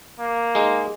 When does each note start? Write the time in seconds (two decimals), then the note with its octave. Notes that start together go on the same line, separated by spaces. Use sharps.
0.20 A#3
0.55 G#3 D#4